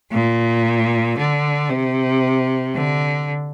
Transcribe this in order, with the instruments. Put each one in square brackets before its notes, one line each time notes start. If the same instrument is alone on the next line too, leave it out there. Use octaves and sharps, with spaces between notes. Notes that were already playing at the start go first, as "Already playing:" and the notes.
[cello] A#2
D3
C3
D3